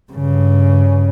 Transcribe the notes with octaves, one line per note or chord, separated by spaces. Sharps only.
G2 C#3